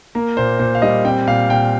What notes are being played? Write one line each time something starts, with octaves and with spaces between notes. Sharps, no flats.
A#3 A#4
A#2 C5
A#2 C5
F5
G3 D#5
C4 G5
A#2 F5
A#2 G5